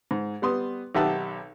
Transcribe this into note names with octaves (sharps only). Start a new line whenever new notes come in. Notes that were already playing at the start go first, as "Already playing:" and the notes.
G#2
G3 B3 C6 D#6
B1 D#3 G4 E5 F#5 A5